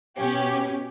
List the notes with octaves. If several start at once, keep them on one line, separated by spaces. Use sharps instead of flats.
B2 C#4 G4